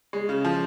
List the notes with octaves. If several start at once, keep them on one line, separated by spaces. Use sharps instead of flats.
G#3
C#3
F3